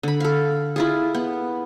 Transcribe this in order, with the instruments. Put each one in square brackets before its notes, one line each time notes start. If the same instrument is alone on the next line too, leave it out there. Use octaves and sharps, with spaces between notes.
[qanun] D3 B5
A4 F5
E4 F4 G#4
B3